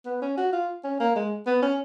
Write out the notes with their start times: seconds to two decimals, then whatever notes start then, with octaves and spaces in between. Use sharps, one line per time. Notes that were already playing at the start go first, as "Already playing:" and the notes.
0.06 B3
0.22 C#4
0.37 F#4
0.53 F4
0.84 C#4
1.00 A#3
1.16 G#3
1.46 B3
1.62 C#4